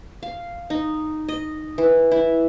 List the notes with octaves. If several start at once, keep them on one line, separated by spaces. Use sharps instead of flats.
F5
D#4
D#5
E3
E4